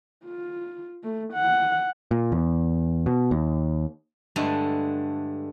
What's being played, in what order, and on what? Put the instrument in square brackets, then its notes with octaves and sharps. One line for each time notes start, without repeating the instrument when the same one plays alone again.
[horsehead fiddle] F4
A3
F#5
[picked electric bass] A#2
E2
B2
D#2
[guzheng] G2 D3 G#3 A3